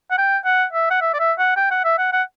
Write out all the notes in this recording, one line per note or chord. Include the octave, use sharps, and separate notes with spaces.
F#5
G5
F#5
E5
F#5
E5
D5
E5
F#5
G5
F#5
E5
F#5
F#5